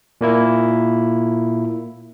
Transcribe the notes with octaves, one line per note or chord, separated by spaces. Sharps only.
A#2 A#3 E4